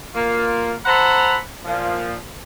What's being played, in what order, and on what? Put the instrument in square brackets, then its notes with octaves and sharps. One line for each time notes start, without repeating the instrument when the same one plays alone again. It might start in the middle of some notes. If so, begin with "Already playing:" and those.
[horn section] A#3 F4
A4 C5 F#5 A#5 B5
A#2 F3